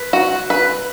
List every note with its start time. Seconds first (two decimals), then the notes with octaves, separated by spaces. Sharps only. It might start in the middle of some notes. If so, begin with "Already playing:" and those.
Already playing: B4
0.13 F#4
0.50 B4